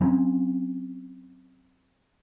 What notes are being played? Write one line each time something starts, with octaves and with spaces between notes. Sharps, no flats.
F#3 C4 C#4